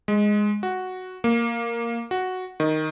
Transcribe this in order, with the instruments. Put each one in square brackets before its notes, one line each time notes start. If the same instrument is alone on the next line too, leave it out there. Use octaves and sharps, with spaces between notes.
[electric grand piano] G#3
F#4
A#3
F#4
D#3